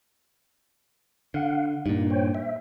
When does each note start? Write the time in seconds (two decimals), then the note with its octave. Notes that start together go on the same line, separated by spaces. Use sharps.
1.34 D3 F5 F#5
1.86 G2 A#2 D#4
2.10 C5 C#5 G5
2.35 E5